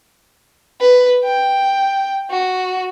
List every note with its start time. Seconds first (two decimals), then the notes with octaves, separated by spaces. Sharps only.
0.81 B4
1.24 G5
2.31 F#4